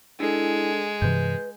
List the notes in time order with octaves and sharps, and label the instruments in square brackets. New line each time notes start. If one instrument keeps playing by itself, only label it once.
[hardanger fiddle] G#3 [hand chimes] D4 A4 [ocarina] E4
[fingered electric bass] G2 C3 E3 [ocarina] B4 [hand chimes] G6